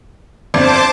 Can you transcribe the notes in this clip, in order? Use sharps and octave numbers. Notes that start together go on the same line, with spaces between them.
G1 F2 C5 D5 A5 D6